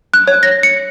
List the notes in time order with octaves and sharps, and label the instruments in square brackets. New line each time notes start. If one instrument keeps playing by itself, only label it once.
[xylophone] F#6
C#5
A#6
C#7